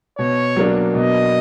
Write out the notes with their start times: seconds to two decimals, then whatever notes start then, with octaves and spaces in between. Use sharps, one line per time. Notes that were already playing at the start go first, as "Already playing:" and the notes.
0.18 B2 C#5
0.56 F#3 A#3 D4
0.95 B2 D#5